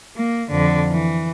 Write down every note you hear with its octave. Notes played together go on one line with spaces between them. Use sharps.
A#3
F2 D3
E3